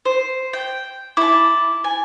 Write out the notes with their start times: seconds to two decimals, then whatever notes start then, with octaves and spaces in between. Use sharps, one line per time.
0.05 C5
0.53 G5
1.17 E4 A5 D6
1.84 G#5